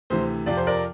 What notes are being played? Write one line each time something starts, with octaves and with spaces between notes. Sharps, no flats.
D2 C3 E3 C5
F2 C3 F3 D5
C5
A#4 D5